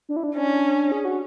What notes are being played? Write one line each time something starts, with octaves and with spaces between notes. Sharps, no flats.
D4
E4
D4
C#4 D4
G#4
F#4